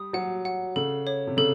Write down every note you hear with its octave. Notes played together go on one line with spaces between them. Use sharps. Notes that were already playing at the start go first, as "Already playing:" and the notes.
Already playing: G3 D#6
F#3 F#5
F#5
C#3 A4
C#5
C3
C#3 A4